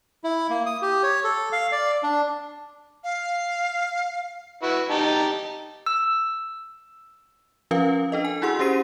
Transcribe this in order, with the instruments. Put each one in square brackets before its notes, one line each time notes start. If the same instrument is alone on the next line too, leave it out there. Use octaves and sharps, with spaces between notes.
[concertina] E4
A#3
D#6
G4
C#5
A4
F5
D5
D4
[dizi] F5
[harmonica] E4 F#4 B4
D#4 G4 A5
[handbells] E6
[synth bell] F3 C#4 F4 A#4 B4 F5
D4 A4 D#5
G#5
E4 F#4 G#4 F#5 C6 E6
C#4 G4 C5 C7 D#7